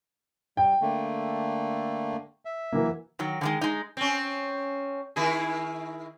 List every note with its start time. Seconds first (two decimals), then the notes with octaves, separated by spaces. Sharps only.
0.57 G3 G5
0.81 D3 A3 A#3
2.45 E5
2.72 E3 F#3 A#3
3.19 D#3 F#3
3.41 D3 D#3 G#3
3.61 G#3 D#4
3.97 C4 C#4
5.16 D#3 E4 G#4